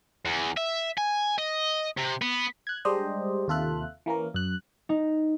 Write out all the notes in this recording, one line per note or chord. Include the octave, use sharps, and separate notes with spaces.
E2
E5
G#5
D#5
C3
B3
F#6 G#6
G3 G#3 D4 G4 C5 D#5
D#2 C3 F4 A4 E5 F#6
E3 A#3 C#4 A#4
F#2 F#6
D#4